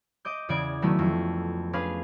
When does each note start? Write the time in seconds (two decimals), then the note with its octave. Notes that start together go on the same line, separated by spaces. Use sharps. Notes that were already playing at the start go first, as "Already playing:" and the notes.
0.25 D#5 D6 G6
0.49 E2 C#3 D5 G#6 D7
0.82 D#3 F#3 A3 B3 C#4 E4
0.99 F2
1.73 C#4 D4 G#4 B4 F5